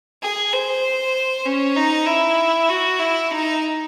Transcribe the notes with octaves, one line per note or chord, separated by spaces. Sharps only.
G#4
C5
C#4
D#4
E4
F#4
E4
D#4